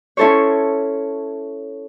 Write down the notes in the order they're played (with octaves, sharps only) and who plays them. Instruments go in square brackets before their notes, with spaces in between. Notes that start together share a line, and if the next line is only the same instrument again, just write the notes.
[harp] C#4 E4 A4 C5 C#5